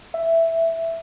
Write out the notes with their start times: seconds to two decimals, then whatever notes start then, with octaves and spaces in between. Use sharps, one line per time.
0.14 E5